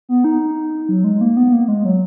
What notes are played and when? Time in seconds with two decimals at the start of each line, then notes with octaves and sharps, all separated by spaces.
0.09 B3
0.24 D#4
0.89 F#3
1.04 G#3
1.21 A#3
1.37 B3
1.53 A#3
1.68 G#3
1.85 F#3